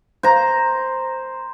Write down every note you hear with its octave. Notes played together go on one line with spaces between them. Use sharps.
C5 A#5